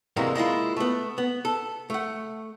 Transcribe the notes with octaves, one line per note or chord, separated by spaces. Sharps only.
D2 C3 E3 G#3 A#3
G#3 A#3 E4 F4
A3 B3
B3
A4
A3 F#5